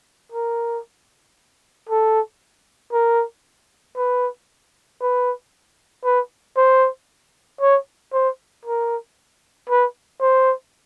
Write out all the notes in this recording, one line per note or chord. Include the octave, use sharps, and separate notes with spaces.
A#4
A4
A#4
B4
B4
B4
C5
C#5
C5
A#4
B4
C5